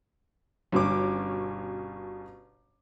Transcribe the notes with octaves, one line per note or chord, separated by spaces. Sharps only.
G1 B2 C#4 D6